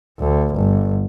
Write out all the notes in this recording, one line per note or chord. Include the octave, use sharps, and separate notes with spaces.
D2
G1